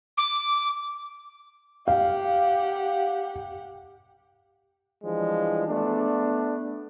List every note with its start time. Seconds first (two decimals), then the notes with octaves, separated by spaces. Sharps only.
0.17 D6
1.88 G4 F5 F#5
5.03 E3 F3 G3 G#3 D4
5.67 A3 B3 D4